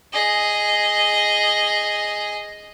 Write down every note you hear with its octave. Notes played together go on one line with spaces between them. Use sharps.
G#4 D#5